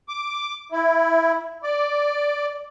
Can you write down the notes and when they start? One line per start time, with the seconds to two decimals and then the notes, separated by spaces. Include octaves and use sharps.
0.08 D6
0.72 E4
1.63 D5